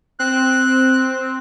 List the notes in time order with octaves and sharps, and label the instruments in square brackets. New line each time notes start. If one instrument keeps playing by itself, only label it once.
[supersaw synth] C4 [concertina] F#6